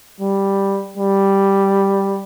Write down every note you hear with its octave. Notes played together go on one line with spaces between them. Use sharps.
G3
G3